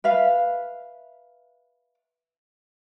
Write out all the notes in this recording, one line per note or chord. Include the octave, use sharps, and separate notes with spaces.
B4 E5 F5